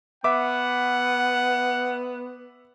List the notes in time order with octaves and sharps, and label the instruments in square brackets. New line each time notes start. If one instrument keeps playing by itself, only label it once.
[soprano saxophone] B3 [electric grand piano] E5 D6 [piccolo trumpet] F#5